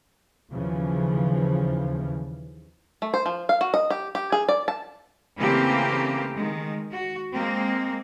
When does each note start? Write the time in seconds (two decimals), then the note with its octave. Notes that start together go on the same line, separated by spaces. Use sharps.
0.51 D#2 C#3 E3 F3
3.02 A3
3.14 C5
3.26 F3
3.49 F5
3.61 F#4
3.74 D#5
3.90 G4
4.15 G4
4.32 G#4
4.49 D5
4.68 A5
5.38 C#3 E3 A3 A#3 C4 G4
6.35 D#3 G#3
6.93 F#4
7.34 G#3 A#3 C4